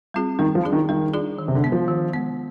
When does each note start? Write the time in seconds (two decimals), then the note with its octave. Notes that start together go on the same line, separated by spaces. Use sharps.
0.14 G3 C4 F4 G#4
0.39 D#3 G3
0.55 F3
0.64 D4 F4 G#4 D5
0.72 D#3
0.89 D#3 G3
1.14 D4 F4 G#4 D5
1.39 D#3
1.48 C3
1.55 D3
1.64 G#3 B3
1.72 F3
1.88 D#3
2.13 G#3 B3